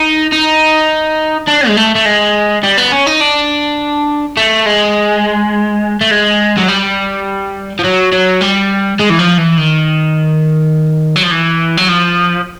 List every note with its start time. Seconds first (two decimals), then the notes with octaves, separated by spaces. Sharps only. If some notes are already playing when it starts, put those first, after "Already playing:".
Already playing: D#4
0.32 D#4
1.48 D4
1.68 G#3
1.77 A3
1.95 A3
2.06 G#3
2.63 G3
2.78 B3
2.92 C#4
3.07 D#4
3.21 D4
4.37 A3
4.66 G#3
6.01 A3
6.11 G#3
6.57 F#3
6.68 G3
7.79 F3
7.84 F#3
8.13 F#3
8.42 G3
8.99 G#3
9.10 E3
9.19 F3
9.38 E3
9.57 D#3
11.16 F#3
11.23 F3
11.31 E3
11.77 F#3
11.89 F3